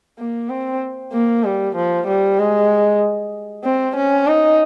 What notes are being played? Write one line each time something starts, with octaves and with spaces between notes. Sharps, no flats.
A#3
C4
A#3
G3
F3
G3
G#3
C4
C#4
D#4